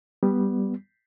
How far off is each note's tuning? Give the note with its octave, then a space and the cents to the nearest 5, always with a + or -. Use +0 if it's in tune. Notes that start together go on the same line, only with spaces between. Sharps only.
G3 +0 B3 +0